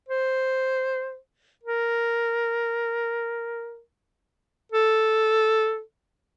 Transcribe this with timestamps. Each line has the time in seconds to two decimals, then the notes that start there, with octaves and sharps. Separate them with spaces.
0.09 C5
1.64 A#4
4.72 A4